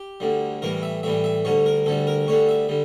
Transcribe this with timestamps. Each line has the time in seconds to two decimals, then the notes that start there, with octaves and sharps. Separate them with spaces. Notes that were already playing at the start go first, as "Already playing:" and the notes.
Already playing: G4
0.20 D2 D3 G3
0.62 A2 E3 G3 A#4
0.83 E5
1.03 A2 E3 G3 E5
1.24 E5
1.45 D2 D3 G3 C#5
1.66 A#4
1.86 D2 D3 G3 A4
2.07 A#4
2.27 D2 D3 G3 C#5
2.49 E5
2.69 D3 G3